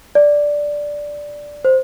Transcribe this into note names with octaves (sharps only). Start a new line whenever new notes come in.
D5
C5